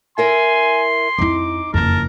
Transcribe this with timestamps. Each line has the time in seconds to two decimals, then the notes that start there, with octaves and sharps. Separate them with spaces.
0.18 E4 A#4 E5 G#5 C6
1.18 F2 D#4 E4 D6
1.74 F#1 F2 A#4 A5